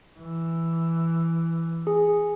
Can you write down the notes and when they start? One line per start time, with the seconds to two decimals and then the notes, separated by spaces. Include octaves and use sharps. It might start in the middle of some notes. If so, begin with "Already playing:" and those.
0.19 E3
1.87 G#4